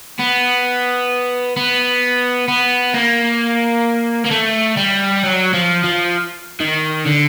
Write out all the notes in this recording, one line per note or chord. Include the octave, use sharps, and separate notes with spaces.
B3
B3
B3
A#3
A#3
A3
G3
F#3
F3
F3
D#3
D3